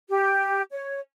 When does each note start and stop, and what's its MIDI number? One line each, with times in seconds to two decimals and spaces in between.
0.08 0.62 67
0.72 0.98 73